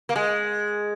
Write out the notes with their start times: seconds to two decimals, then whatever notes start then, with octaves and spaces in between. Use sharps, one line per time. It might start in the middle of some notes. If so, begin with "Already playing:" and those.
0.09 A#3
0.16 G#3